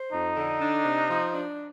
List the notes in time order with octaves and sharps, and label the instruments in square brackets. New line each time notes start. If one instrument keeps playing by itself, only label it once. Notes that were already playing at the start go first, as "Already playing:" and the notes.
Already playing: [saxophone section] C5
[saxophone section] F2 [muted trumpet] D#4
[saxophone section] D3
D4
C3
F3
D4